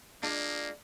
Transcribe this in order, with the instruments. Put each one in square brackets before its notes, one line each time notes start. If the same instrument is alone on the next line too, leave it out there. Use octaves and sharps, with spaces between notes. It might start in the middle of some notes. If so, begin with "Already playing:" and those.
[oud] G#3 D4 F4 [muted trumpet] A#3